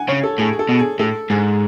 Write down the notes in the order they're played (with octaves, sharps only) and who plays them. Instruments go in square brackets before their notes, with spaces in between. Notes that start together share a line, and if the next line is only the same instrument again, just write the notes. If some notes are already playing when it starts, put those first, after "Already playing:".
Already playing: [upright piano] F#5 G#5
[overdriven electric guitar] C#3 [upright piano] C#5
[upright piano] A4
[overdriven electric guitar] A2 [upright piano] G#4
[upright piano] G#4
A4
[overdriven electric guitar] B2
[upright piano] G#4
[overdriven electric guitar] A2 [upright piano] A4
[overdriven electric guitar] G#2 [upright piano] G#4